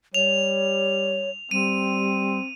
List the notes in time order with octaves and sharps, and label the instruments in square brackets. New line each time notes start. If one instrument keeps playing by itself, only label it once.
[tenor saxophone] G3 [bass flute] C#5 [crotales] F7
[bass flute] G3 [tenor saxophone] C4 [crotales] D#7